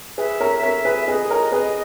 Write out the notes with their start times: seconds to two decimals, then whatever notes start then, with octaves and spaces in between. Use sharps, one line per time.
0.18 G#4 B4 E5
0.41 A#4 C#5
0.62 A#4 C#5
0.85 G#4 B4
1.08 G#4 B4 D#5
1.30 A#4 C#5
1.52 G#4 B4